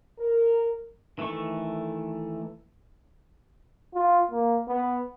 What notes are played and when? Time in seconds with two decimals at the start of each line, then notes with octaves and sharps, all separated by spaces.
0.19 A#4
1.18 D#3 E3 A3 A4 C#6
3.95 F4
4.31 A#3
4.68 B3